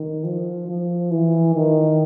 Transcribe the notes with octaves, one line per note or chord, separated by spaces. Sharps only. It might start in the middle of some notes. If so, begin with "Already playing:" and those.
Already playing: D#3
F3
F3
E3
D#3